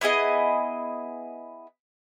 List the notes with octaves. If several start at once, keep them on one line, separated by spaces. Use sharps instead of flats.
B3 E4 G#4 D#5